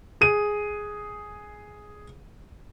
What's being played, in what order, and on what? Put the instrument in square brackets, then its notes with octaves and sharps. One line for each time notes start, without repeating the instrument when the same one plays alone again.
[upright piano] G#4 D#7